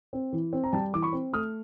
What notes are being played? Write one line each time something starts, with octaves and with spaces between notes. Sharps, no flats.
C4
E3
C4
A#5
G3 G5 A5
E3 D6
B5 C#6
C4
A3 D#6 F6